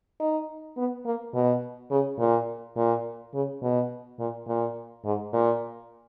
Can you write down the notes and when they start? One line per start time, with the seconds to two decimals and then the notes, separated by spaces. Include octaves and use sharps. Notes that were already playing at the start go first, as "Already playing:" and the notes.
0.20 D#4
0.77 B3
1.05 A#3
1.34 B2
1.91 C#3
2.19 A#2
2.76 A#2
3.34 C#3
3.62 B2
4.19 A#2
4.48 A#2
5.04 G#2
5.33 A#2